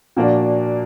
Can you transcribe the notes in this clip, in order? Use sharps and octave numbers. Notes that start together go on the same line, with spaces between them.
A#2 F3 A#3 D4 F#4